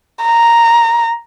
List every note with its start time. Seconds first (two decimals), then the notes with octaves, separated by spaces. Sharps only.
0.24 A#5